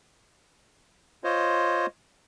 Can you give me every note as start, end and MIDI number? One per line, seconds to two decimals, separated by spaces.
1.24 1.86 65
1.24 1.86 72
1.24 1.86 73
1.24 1.86 75